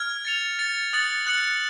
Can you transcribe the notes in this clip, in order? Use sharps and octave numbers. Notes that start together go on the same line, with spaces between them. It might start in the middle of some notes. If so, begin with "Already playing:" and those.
Already playing: F6 G#6
A6 C#7 F7
A6 C#7 F7
D#6 F#6 A6 C#7 F#7
D#6 F#6 A6 C#7 F#7